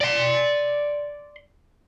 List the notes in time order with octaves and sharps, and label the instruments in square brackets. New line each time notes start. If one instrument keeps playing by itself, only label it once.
[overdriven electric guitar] D5 C6